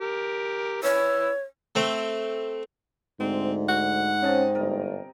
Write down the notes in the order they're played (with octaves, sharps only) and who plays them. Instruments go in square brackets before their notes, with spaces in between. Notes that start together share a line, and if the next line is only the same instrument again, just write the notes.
[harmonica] G4 A#4
[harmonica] E4 B4 E6 [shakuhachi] C#5
[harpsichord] A3 C4
[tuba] D2 [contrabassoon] G#2 [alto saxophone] C4
[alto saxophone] F#5
[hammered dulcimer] C3 D#5 A5 [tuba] C#4
[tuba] G1 [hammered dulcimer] A#4